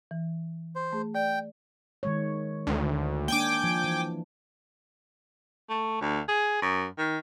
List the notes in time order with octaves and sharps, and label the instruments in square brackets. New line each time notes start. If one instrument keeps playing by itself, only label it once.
[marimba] E3
[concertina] C5
[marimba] A3 G#4
[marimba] D5 [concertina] G5
[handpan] D#3 G#3 C#5
[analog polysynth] D2
[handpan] A#3 D4 [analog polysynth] G5 G#5 D6
[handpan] F3
E3
[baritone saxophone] A3
D2
G#4
F#2
D#3